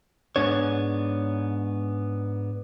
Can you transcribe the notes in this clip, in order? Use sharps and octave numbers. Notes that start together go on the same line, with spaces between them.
G#2 B3 D4 C#5